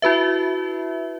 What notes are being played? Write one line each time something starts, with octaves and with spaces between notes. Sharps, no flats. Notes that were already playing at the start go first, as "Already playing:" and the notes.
E4 F#4 B4 E5